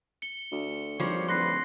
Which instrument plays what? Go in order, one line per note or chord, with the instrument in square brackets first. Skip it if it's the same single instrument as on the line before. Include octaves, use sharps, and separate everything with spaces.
[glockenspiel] C#7 G7
[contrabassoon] D2
[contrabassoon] G#1 [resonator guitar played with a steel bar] F3 G3 [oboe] C#5
[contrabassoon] D1 [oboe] B4 [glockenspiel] C6 A#6 C7